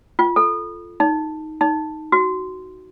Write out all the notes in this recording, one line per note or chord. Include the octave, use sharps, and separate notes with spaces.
F4
A4
D#4
D#4
F#4